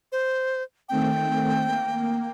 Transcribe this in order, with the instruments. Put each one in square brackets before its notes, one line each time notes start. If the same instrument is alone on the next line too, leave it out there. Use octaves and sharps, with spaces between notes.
[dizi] C5
[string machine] D#3 A3 C4 [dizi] G5
[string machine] A#3